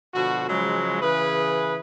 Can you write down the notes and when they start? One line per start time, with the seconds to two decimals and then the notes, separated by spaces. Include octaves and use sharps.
0.14 B2 D3 F3 F#4
0.48 C#3 F3 F#3 G#3
1.01 C#3 E3 G#4 B4